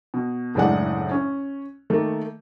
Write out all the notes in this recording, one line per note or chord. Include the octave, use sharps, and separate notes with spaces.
B2
F#1 A2 G#3 D4 F#5
C#4
D#3 A3 A#3